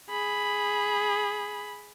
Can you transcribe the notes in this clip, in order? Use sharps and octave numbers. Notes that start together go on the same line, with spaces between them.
G#4 B5